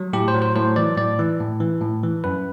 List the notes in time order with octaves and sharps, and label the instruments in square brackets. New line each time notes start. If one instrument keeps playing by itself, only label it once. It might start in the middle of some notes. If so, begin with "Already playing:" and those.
Already playing: [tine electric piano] F#3
A2 G4
C5
F#3
C5
A2 C5
E3 D5
A2 D5
E3
A2
E3
A2
E3
F#2 B4